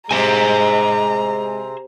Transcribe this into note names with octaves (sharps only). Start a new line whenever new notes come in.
C3 G#3 G#4 C5 G#5 A#5